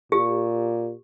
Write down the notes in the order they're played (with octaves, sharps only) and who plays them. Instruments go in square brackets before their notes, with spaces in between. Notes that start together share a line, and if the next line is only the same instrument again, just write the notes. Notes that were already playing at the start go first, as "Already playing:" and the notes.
[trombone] A#2 [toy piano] G4